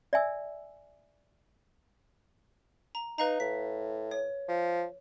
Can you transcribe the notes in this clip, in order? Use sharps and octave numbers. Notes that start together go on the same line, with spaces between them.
D5 E5 G#5 E6
A#5
D#4 B4 F5 A#5
A2 B6
C#5
F3